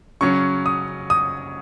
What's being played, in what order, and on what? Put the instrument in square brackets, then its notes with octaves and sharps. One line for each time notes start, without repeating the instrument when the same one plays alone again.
[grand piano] C#3 F#3 C#4 C#6
D#6
D#6